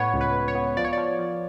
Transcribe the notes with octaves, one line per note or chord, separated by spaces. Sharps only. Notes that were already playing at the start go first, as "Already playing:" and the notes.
Already playing: A2 B3 C#5
C#2
B4
C#2
C#5
B3
F3 D5
C#5
F3 D5
F3